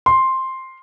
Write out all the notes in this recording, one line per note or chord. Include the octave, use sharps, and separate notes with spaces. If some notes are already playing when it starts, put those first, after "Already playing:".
C6